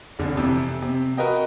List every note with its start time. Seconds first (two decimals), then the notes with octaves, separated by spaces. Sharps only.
0.19 F1 D3
0.36 F2 C3 E3
0.82 C3
1.17 F#4 A#4 B4 D#5 G5